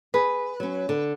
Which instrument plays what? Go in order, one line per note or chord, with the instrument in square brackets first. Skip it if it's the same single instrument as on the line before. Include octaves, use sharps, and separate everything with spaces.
[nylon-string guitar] G#4 [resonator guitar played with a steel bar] B4
[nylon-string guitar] F#3 C#4
D3